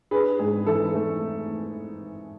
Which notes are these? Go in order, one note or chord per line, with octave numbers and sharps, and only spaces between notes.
D4 G#4 B4
G#2 G#4
E3 A4
A3